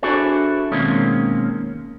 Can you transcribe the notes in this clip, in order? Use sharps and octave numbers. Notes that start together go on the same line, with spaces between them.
D4 E4 F#4 G#4 A4 C5
B2 D#3 G#3 A#3 C4 C#4